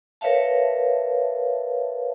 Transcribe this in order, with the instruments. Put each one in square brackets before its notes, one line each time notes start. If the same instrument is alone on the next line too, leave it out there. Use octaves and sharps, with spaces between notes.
[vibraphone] A#4 B4 C#5 E5 F5 A5